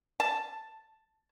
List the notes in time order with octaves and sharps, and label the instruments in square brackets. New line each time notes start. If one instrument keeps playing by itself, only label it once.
[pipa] A5